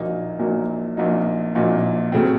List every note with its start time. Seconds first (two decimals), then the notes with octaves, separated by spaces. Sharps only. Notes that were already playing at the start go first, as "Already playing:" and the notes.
Already playing: A#1 A#2 F#3 A#3 D#4
0.39 A#1 A#2 F#3 A#3 D#4
0.97 A#1 A#2 F#3 A#3 D#4
1.55 A#1 A#2 F#3 A#3 D#4
2.12 C#3 F#3 A3 C4